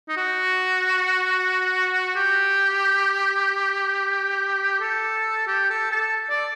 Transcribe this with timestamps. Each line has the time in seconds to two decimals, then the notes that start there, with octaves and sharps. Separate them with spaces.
0.09 D#4
0.17 F#4
2.16 G4
4.81 A4
5.48 G4
5.70 A4
5.91 A4
6.30 D5